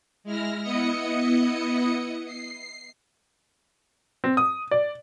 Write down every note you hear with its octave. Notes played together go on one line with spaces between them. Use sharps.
G#3 E4 F6 A#6
B3 E4 D#5 D#6 C#7
C7
C4
D#6
D5